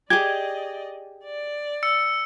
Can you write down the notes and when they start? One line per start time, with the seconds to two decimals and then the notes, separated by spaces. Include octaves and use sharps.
0.10 G4 G#4 D5 D#5 G#6
1.24 D5
1.83 E6 C#7